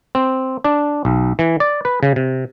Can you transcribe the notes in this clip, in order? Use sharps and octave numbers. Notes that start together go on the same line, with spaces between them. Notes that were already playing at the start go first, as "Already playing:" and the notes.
C4
D4
B1
E3
D5
B4
C#3
C3